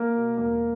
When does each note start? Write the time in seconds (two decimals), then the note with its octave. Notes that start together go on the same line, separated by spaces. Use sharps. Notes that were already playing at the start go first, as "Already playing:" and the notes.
Already playing: A#3 A#4
0.15 B2
0.38 E1 A#3 A#4